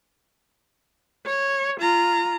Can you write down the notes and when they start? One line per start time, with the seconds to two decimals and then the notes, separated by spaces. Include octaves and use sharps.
1.26 C#5
1.80 F4 A#5